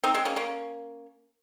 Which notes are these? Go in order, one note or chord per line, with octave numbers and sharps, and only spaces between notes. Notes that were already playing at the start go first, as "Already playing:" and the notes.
C4 D#4
G#3 C4
A#3 C#4
A#3 C#4